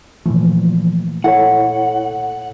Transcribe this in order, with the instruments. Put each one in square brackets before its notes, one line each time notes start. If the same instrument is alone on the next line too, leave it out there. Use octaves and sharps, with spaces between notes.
[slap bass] A#2 A3 [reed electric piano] E3 F3
[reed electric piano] E4 A4 C#5 [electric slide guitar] F#5